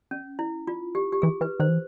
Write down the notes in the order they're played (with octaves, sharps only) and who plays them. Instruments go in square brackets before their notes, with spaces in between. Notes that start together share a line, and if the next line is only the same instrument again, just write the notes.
[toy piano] C#4
E4
F4
G4
G4
[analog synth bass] E3 [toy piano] G#4
[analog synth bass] E3 [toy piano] B4
[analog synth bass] D#3 [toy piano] C5
[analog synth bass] E3